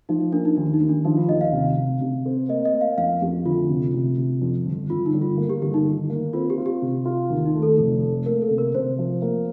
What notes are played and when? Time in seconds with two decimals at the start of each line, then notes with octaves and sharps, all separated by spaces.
0.09 F3 D#4
0.20 D#4
0.32 A#3 D4
0.45 D#4
0.57 D#2 D4
0.74 D#4
0.81 D#2
0.89 D4
1.05 F3 D#4
1.17 F4
1.29 D#2 D#5
1.41 F5
1.53 C3
1.77 C3
2.01 C3
2.26 C4
2.49 A#3 D#5
2.65 D#5
2.73 A#3
2.81 F5
2.97 F2 F5
3.22 F2 G4
3.46 D2 F4
3.69 C3
3.94 C3
4.18 C3
4.41 F2
4.65 G1
4.90 G1 F4
5.06 D#4
5.14 G1
5.22 F4
5.38 A#3
5.49 G4
5.62 G1 G4
5.74 D#4
5.86 D#3
6.10 A#3
6.33 C4 F4
6.50 G4
6.58 F4
6.66 G4
6.82 C3
7.05 F4
7.30 D#2
7.46 D#4
7.54 A3
7.63 A4
7.78 F1
8.02 A3
8.26 A#3 A#4
8.42 A4
8.51 C3
8.58 A#4
8.75 C3 C5
8.99 F3
9.22 A#3